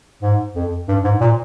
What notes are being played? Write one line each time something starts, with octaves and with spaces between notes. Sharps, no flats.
G#2
F2
G2
G#2
A#2